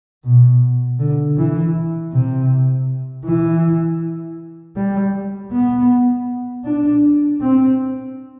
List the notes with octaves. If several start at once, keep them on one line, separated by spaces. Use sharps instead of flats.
B2
D3
E3
C3
E3
G3
B3
D4
C4